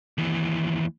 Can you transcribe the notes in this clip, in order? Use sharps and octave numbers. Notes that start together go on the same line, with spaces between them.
D#2 E3